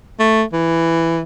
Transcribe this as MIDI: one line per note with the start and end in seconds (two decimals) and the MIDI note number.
0.19 0.43 57
0.53 1.22 52